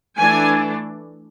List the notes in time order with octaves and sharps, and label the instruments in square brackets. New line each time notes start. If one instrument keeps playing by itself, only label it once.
[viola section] E3 A3 D4 G#5